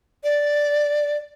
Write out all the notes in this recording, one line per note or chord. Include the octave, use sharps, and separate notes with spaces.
D5